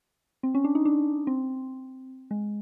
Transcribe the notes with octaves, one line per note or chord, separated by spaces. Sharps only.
C4
C#4
D4
D#4
D4
C4
G#3